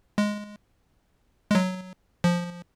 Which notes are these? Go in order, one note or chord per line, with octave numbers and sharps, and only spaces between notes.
G#3
G#3
F#3
F3